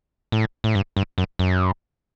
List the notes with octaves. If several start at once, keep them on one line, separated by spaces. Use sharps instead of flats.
A2
A2
G2
G2
F#2
F#2